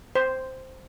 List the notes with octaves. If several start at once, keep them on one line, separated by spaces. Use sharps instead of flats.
C5